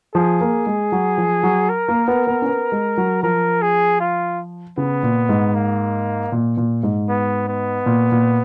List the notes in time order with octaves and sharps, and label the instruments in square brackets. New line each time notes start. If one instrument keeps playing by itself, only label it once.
[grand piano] F3 [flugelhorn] G#4
[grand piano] A#3
G#3
F#3
F3
F#3
[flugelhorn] A#4
[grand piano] A#3
B3
B3
C#4
B3
G#3
F#3
[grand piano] F3 [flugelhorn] A#4
[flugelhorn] G#4
F4
[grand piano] C#3 [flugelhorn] B3
[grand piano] A#2
G#2
[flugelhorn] A#3
[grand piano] A#2
A#2
G#2
[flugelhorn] B3
B3
[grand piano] A#2
A#2